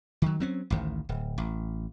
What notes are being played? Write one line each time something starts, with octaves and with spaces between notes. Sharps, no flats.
D#3 F#3
F#3 C4 C#4
A1 D2 D#3
D1
A1